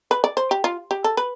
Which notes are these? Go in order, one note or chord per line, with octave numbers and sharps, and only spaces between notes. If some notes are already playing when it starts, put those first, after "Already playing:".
B4
D5
C5
G4
F4
G4
A4
B4